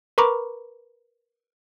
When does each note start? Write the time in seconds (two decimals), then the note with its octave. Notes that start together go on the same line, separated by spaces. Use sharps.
0.18 A#4 B4 A#5 B5 C#6 D6